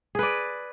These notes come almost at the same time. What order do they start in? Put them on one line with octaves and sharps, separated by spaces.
G#4 B4 D5